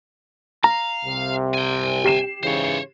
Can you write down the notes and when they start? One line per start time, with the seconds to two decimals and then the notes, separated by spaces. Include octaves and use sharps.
0.64 F5 A#5
1.05 C2 C3
1.54 G5 G#5
2.04 G4 C7 E7
2.43 G#2 C#3 E3 C5 C#5